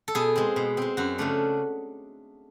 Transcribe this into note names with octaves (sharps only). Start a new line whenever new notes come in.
A4
B2 G#4
G#3 C4
B2
G#3 C4
F#2 F#4
C#3 F3 A3 D4